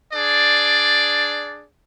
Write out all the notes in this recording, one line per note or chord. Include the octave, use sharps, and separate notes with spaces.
D4 G#4 D5